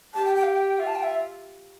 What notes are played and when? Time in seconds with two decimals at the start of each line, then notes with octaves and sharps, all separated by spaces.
0.14 G4 A5
0.25 G5
0.35 G5
0.43 F5
0.51 G5
0.79 F4 E5
0.87 A5
0.95 G5
1.03 E5